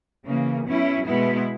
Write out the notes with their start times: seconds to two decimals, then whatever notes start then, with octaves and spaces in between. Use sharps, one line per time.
0.26 C#3 E3 A#3
0.65 B2 F#3 C#4 E4
1.06 B2 G#3 B3 E4